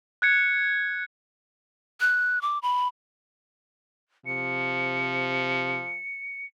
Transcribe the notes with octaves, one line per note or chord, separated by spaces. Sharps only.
F#6 G#6 C#7
F#6
D6
B5
C3 F3 C#7